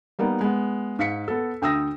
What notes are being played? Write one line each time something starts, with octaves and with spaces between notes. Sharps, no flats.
G3 A#3 B3 D#4
G#3 B3
G#2 F5 B6 C#7
B3 A4
D2 G5 D#6 E6 A#6